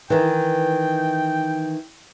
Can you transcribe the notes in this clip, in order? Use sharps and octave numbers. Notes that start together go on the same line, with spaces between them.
D#3 E3 G5